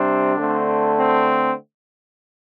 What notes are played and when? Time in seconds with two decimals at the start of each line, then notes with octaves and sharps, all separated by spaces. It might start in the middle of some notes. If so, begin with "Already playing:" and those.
Already playing: C3 G3 C4 D4
0.37 D3 A3 C4
0.97 C4